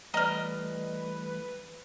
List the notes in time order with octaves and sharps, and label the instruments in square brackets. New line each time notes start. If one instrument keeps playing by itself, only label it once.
[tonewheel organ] E3 G3 A3 [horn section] B4 [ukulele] D5 A#5 [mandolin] D#5 F6